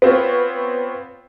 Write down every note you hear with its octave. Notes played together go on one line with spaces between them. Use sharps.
B3 C4 F4 C#5